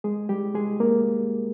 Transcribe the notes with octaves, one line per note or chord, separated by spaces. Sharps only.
G#3 G#4
G3 G4
G#3 G#4
A#3 A#4